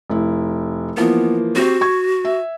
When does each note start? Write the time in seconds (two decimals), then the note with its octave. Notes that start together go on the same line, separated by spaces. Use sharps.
0.10 F1 E4
0.97 E3 F3 A#3 B3
1.56 C4 F#4 G4 C5
1.81 C#6 G#6
2.25 E5